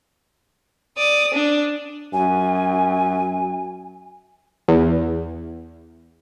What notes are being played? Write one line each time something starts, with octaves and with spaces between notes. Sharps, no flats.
D5 D#6
D4
F#2 G#5
E2